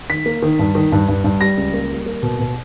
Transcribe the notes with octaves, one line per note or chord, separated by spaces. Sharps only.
D#3 B6
A#3
D#3
G2
D#3
G2
G2
G2
G3 A#6
C#2
A#3
G3
A#3
B2
B2